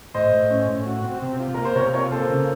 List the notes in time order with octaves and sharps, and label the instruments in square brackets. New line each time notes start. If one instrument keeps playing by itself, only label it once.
[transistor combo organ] A2 [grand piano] C5 D#5
[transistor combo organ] A2
C#4
A2
F#4
C4
C3
F4
[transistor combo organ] A#3 [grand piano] A#4
[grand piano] C5
[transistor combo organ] C3 [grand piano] A#4 C#5
[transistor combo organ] F4 [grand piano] A#4 C#5
[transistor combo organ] A#3 [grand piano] A4 C5
[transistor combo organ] C#3